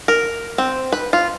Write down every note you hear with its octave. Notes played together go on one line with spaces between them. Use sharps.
A#4
C4
B4
F4